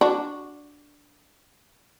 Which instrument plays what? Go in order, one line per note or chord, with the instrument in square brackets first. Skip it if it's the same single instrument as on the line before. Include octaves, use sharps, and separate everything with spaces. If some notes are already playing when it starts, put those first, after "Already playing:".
[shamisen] D4 F#4